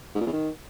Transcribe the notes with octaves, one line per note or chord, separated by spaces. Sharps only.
G#2
A#2
E2
D#3